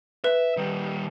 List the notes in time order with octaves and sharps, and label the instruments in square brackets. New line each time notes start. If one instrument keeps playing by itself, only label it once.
[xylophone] B4 [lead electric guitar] E5
[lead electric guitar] D#3 G3